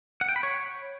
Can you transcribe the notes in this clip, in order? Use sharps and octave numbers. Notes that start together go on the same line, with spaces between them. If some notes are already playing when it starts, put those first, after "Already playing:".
F#5
G5
B5
C#5